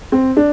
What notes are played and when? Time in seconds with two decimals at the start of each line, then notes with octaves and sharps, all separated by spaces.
0.12 C4
0.37 D4